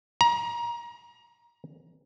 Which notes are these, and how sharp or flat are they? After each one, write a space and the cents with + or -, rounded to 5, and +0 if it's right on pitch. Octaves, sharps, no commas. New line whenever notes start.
A#5 +25